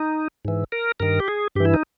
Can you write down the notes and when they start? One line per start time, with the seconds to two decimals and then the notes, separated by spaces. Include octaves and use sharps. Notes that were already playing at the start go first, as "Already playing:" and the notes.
Already playing: D#4
0.45 G#2 E3
0.72 A#4
1.00 G2 D#3 A#4
1.20 G4
1.28 G#4
1.56 G2 E3 G4
1.65 E4
1.74 D#4